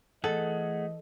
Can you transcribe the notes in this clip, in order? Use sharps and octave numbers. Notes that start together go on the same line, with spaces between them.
E3 A3 G#4 A4 D#5 F#5